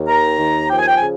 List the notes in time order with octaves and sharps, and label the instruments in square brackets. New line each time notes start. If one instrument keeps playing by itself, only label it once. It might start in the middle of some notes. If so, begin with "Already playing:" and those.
Already playing: [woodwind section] D#2
D#3 A#5
D#2
F3 G5
G#5
G5
C#3 G#5